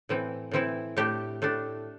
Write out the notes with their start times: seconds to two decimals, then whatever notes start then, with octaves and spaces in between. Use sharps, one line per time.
0.09 A2 E3 C4
0.51 A2 E3 C4 E4
0.97 A2 A3 D4 G4
1.42 A2 A3 D4